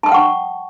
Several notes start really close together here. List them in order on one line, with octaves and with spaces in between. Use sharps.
A5 D#6 G5 F#5 C#6